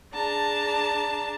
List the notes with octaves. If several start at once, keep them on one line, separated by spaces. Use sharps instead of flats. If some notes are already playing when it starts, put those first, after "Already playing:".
D4 G#4 A5 A#5